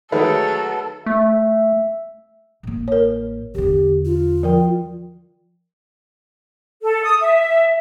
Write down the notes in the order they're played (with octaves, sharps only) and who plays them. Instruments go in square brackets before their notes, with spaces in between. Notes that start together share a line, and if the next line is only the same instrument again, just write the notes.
[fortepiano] D#3 G#3 A3 [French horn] F#3 [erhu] A4 [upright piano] B4
[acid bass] A3 [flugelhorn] E5
[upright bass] A1 A#3
[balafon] A#4 C#5
[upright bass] E2 D3 [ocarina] G4
[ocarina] F4
[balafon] F3 A#4 G5
[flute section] A4
D#6
E5